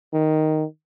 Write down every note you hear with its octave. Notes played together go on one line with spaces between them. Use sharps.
D#3